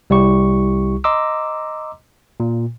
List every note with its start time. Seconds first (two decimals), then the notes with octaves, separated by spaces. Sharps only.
0.10 C2 G3 E4 G4 C#6
1.04 D#5 A#5 C6 D6 E6
2.40 A#2